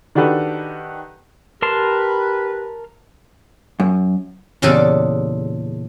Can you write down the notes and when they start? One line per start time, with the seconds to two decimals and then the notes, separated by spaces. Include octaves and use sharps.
0.15 D#3 D4 F#4 G4 A4 B4
1.62 G4 A#4 B4 A5 C6
3.80 F#2
4.62 E2 A#2 C#3 D4 G4 A4